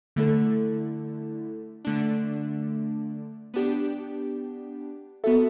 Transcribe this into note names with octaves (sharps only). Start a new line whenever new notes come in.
D3 A3 E4 A4
D3 A3 D4
B3 D4 G4
B3 F#4 A4 E5